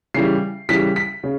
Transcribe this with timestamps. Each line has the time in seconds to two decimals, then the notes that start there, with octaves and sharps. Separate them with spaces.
0.14 C#3 E3 G3 C7
0.69 C#3 E3 G3 B6
0.96 B6
1.24 C#3